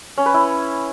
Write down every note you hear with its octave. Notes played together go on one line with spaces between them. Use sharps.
C#4
B4
E4